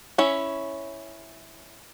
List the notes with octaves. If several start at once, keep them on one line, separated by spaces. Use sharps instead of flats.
C#4 E4 C#5